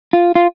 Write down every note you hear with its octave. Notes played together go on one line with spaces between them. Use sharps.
F4
F4